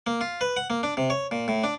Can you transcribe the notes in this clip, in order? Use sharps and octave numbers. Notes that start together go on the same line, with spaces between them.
A#3
F4
B4
F#5
A#3
D4
C3
C#5
A#2
A2
D4